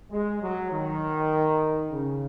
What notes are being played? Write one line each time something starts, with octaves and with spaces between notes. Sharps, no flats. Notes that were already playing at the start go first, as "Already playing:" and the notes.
G#3
F#3
D#3
C#3